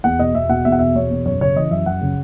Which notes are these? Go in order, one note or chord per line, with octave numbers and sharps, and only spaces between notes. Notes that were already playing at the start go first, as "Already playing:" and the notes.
E2 F#5
B2 D#5
E2 E5
B2 F#5
E2 E5
F#5
B2 E5
E2 C#5
B2
F#2 C#5
C#3 C#5
E3 D#5
F#2 E5
F#2 F#5
C#3